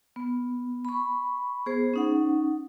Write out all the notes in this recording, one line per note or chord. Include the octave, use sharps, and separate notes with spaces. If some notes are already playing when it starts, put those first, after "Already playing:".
B3
B5 C#6
B3 G#4 C5
C#4 D#4 F#5